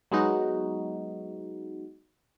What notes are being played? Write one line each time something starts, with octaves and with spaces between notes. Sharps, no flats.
F#3 G#3 B3 D#4 F#4